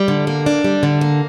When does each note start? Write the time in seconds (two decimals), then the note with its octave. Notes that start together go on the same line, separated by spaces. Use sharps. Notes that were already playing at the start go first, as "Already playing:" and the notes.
Already playing: G3
0.08 D3
0.27 A#3
0.46 D4
0.64 G3
0.83 D3
1.01 A#3